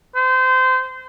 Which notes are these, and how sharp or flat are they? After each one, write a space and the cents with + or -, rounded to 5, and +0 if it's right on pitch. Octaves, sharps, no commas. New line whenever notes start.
C5 -25